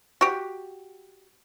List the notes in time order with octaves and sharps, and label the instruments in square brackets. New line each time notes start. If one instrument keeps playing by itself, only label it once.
[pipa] F#4 G4